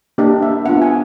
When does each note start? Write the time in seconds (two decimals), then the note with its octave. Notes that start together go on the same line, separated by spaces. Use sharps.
0.18 A#3 D4 G4 D#5
0.42 E5
0.65 B3 D4 F4 F#5
0.82 G#5